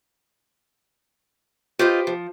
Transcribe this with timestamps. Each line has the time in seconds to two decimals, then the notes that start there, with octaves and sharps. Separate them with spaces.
1.79 F4 G4 B4 C5 D#5
2.07 F3